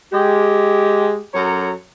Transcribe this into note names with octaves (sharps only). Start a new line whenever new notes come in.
G#3 G4
F#2 F#3 A4 C#5 A#5